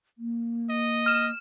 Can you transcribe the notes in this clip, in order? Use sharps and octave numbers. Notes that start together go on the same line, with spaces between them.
A#3
D#5
F6 E7